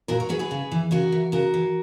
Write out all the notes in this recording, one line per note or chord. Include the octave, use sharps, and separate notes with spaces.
A#2 F#4 A#4
A#4 C#5
F#3 G#4 B4
G#4 B4
C#3
E3
C#3 F#4 A#4
E3
C#3 F#4 A#4
E3